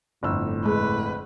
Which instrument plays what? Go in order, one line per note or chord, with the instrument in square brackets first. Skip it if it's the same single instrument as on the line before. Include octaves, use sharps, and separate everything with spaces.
[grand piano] G1 F2 E6 [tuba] A2
[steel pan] G#3 [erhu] B4